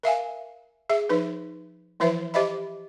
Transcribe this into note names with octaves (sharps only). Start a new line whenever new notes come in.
A#4 E5 F5 G#5
G#4 E5
F3 D#4 B4
E3 F3 E4 B4 C5 E5
G4 C5 D#5 E5 B5